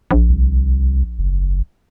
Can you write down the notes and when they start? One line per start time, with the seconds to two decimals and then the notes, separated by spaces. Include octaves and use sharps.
0.11 A#1
0.29 C2
1.19 F#1